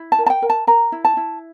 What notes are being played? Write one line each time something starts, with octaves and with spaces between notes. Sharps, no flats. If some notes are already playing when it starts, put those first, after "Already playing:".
Already playing: E4
A5
A#4
A5
G5
A#4
A5
A#4 A#5
E4
A5
E4